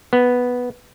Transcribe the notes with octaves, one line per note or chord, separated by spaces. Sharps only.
B3